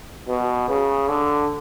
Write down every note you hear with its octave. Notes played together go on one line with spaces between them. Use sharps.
B2
C#3
D3